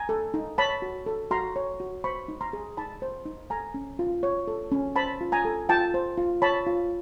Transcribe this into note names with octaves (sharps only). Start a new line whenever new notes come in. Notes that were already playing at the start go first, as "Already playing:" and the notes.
Already playing: G#5 A#5
A4
D#4
C#5 A5 B5
F#4
A4
F#4 A#5 C6
C#5
F#4
C5 B5 C#6
D#4
A#5 C6
G#4
D#4 A5 B5
C5
D#4
A4 G#5 A#5
C#4
F4
C#5
A4
C#4
C5 A5 B5
F4
G#5 A#5
A4
F4 G5 A5
C5
F4
C#5 A5 B5
F4